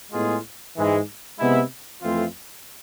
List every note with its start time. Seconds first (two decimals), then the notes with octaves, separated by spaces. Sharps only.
0.12 A2 G#3 B3 F4 G#4
0.76 G#2 E3 G#3
1.39 C3 G#3 B3 E4
2.02 F2 E3 A3 C4 F4